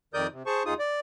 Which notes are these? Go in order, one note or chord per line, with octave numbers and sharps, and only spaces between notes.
F2 D#3 A#4 D5 D#6 G6
C3
G#4 C5 A5 C#6
D#2 D#4 F4 G#4 D#6
D5